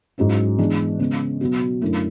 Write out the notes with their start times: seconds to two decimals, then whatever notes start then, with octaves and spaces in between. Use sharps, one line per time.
0.18 G#2 F#3 C#4 E4
0.58 E3 G#3 B3 D4
0.99 C#3 G#3 B3
1.41 B2 F#3 B3 F#4
1.81 F#2 D3 A3 E4